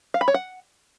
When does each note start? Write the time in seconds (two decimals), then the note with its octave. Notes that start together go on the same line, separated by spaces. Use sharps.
0.14 F5
0.21 B5
0.28 C#5
0.34 F#5